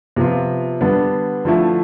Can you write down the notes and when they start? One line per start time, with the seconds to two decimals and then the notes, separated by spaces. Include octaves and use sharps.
0.16 C3 F3 B3 F4
0.81 D3 G3 B3 D4
1.45 D3 F3 A3 E4